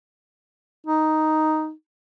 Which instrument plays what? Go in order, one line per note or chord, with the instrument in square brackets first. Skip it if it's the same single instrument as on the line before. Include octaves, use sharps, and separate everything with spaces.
[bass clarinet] D#4